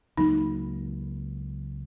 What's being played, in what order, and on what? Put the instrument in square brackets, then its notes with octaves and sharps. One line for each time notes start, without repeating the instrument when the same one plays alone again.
[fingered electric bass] C#2 F#3 A#3 [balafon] D#4